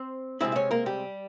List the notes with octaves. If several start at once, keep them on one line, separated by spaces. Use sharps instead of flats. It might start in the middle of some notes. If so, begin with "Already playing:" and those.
Already playing: C4 C5
C3 F3 G#3 C4 E4 E5
E5
C#4 C#5
A#3 A#4
G3 G4